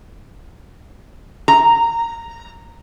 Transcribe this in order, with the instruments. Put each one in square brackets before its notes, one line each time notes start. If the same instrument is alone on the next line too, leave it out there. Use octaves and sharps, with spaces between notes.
[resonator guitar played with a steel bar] A#5